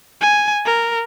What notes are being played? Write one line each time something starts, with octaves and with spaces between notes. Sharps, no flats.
G#5
A#4